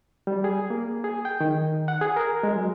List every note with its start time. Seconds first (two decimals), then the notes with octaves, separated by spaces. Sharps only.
0.27 G3
0.44 G#4
0.70 A#3
1.04 G#4
1.25 G5
1.40 D#3
1.88 F#5
2.01 G#4
2.16 A#4
2.43 G#3
2.55 F#3